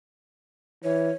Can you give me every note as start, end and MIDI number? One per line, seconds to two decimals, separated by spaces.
0.84 1.11 52
0.84 1.13 73